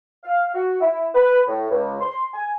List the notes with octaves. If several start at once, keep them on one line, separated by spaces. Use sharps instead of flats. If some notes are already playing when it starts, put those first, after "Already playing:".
F5
F#4
E4
B4
A2
C#2
C6
G#5